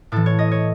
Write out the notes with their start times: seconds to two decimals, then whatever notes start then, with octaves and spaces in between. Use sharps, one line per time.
0.12 A2 E3 A4
0.26 C#5
0.39 D#5
0.51 C#5